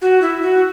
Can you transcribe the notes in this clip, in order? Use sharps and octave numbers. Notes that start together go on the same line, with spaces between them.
F#4
E4
F#4